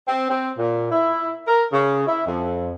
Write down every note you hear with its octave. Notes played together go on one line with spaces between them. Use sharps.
C4
C4
A#2
E4
A#4
C#3
E4
F2